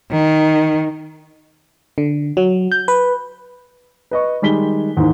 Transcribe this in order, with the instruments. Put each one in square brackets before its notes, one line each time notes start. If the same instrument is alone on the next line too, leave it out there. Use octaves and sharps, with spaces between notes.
[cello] D#3
[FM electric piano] D3
F#3
G6
B4
[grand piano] B4 D#5 C#6
D#3 G3 G#3 B6 G7
D#2 G#2 E3